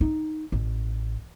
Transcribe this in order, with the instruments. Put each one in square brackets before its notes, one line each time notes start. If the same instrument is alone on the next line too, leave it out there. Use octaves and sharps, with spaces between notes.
[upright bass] D#4
A1